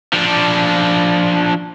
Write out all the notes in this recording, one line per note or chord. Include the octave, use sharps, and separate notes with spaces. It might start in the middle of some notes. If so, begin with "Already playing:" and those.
F3 D4